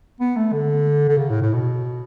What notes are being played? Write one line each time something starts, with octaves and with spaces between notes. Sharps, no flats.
B3
A3
D3
D3
C#3
A2
A2
B2